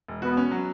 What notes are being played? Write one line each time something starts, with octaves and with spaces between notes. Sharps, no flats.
E1
B3 F#4
C#4
F#3